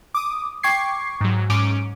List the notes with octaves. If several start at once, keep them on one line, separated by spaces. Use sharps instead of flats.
D6 D#6
G5 C#6 D6 G#6 C7
G#2 F#3
G#2 C#4 D6 D7